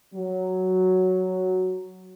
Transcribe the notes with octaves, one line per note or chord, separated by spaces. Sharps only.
F#3